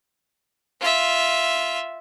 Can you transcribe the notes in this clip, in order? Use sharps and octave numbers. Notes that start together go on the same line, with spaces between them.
F4 E5